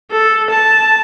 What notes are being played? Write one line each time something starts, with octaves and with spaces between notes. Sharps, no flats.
A4
A5